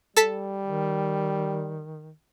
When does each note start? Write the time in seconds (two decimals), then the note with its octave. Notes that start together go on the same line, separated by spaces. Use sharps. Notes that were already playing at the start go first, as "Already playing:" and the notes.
0.17 G3 A4 A5 B6
0.65 D#3